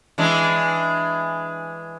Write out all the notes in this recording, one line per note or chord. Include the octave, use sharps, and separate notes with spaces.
E3 G#3 D4